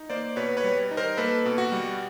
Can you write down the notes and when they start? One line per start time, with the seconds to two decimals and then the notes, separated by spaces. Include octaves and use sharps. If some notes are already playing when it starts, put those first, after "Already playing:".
Already playing: D#4
0.10 A#3 C5 D5
0.36 B2 B4 C#5
0.57 B4 C#5
0.64 G3
0.91 D#4
0.97 A#4 C5
1.17 A#3 A4 B4
1.46 B2
1.58 F#4
1.72 G3